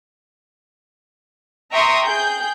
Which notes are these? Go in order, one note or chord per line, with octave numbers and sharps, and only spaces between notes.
E5 G5 A#5 C6 C#6 D#6
G#4 G5 G6